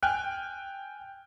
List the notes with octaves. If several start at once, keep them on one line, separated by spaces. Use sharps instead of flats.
G5 G#5 F6 F#6